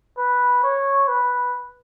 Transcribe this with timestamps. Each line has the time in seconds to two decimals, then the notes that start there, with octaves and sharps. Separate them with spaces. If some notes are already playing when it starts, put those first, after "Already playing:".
0.18 B4
0.63 C#5
1.08 B4